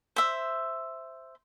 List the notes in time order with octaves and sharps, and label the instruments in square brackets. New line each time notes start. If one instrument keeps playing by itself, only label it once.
[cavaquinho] C5 E5